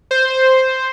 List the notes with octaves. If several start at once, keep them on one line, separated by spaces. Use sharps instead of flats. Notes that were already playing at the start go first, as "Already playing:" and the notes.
C5